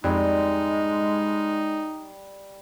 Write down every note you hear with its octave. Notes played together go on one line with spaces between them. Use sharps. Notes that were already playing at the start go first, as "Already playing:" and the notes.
F2 G3 G#3 D#4